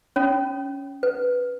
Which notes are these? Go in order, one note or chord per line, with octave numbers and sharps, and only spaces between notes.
C#4 C#5
B4